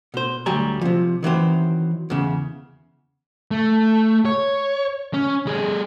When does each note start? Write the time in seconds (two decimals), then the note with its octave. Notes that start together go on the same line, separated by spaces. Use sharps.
0.14 B2 C5
0.46 D2 F#3 G3 G4 G#5 A#5
0.81 C3 F3
1.23 D#3 E3 F#3 C4
2.10 E2 C#3
3.51 A3
4.25 C#5
5.14 C#4
5.47 G3 G#4